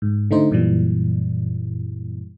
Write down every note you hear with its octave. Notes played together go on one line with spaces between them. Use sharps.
G#2
D3 A3 D#4 C5
F#2 A#2 E3 G3